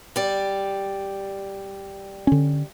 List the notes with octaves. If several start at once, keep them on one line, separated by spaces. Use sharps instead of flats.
G3 D5
D3 C#4